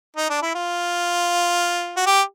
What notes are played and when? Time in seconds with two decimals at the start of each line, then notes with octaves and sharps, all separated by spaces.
0.17 D#4
0.30 D4
0.42 E4
0.55 F4
1.96 F#4
2.06 G4